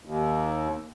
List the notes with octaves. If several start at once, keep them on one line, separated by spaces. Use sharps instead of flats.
D#2